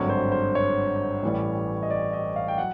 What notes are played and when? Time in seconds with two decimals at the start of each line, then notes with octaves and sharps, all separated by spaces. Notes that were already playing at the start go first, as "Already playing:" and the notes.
Already playing: G#1 G2 D3 F#3 C#5
0.09 C5
0.32 C5
0.55 C#5
1.22 A1 A2 E3 G3
1.83 D#5
1.90 D5
2.13 D#5
2.36 F5
2.48 G5
2.58 F#3 F#5